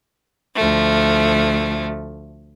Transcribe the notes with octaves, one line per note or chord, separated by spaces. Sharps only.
D2 F3 A3